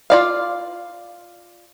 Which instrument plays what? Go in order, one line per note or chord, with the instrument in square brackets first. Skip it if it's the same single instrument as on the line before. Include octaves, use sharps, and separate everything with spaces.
[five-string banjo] F4 D5 F5